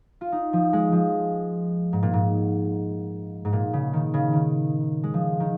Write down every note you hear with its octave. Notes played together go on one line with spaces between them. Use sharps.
F4
D#4
F3
G#3
F3
G#2
A#2
G#2
G#2
A#2
C#3
D#3
C#3
D#3
G#3
F3
D#3